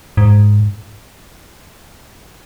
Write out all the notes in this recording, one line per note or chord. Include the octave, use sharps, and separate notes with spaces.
G#2